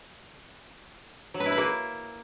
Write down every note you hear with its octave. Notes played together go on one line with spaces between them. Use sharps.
F#3
B4
E4
B4
A#3